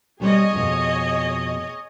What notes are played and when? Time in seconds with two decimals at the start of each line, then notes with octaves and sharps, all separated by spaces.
0.20 B2 G3 C4 G#4 C#5 D#5
0.53 F2 B2